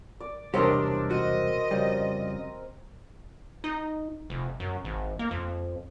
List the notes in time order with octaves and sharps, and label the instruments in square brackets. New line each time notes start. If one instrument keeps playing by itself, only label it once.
[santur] D5
[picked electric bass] E1 C2 [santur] C4 A#4 [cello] D4 [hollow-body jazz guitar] G4 C#5 D#5
[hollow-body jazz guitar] F#4 [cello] D#5
[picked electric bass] F2 C#3 G3
[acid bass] D#4
F1
F#2
G#1
A#3
F2